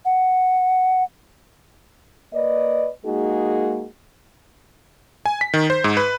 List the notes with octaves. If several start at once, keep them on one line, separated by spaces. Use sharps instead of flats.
F#5
A#3 B4 D5 D#5
G#3 A#3 D#4 F#4 G#4
G#5
B6
D#3
C5
G#2
B4